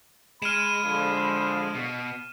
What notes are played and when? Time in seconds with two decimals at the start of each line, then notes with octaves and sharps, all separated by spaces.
0.42 G#3 B5 F6 D#7 E7
0.85 D3 F3
1.75 B2